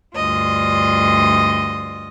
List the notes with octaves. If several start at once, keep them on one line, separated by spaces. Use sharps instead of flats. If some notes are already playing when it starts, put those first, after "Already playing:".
D2 G2 F4 D#5